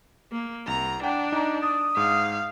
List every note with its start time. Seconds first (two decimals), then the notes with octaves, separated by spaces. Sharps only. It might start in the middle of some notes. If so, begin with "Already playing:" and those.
0.32 A#3
0.67 C2 A#5
1.04 D4 F#5 G5
1.32 D#4 A#5
1.63 D#6 A6
1.97 G#2 F5